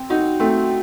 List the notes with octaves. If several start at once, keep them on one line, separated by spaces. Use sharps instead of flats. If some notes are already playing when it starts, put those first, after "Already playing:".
Already playing: C4
D#4 F#4
A3 C4